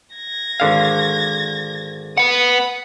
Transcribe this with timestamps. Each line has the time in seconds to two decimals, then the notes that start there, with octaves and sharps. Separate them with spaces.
0.16 G#6 A#6
0.60 G#1 D3 F5
2.18 B3 F#5 D#6